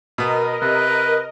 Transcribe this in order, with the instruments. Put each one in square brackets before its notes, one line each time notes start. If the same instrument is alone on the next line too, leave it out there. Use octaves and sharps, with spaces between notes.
[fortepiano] B2 B3 [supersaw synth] A#4 D#5
[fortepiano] C3 [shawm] B4